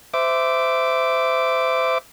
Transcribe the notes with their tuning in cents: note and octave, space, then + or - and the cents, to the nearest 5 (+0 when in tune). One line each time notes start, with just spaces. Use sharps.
C5 -25 E5 +0 D6 +0